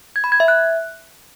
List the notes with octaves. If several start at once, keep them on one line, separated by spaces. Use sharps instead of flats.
G#6
B5
G#6
E5
F#6